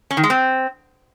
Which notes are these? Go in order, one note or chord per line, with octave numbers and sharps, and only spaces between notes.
C#4
D#3
G#3
C4